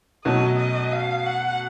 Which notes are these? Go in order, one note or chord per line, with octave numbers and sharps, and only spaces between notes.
B2 F#3 A3 C#4 F#4 D#5
D#5
F5
F#5